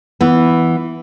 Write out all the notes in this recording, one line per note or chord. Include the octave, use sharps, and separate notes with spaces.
E3 B3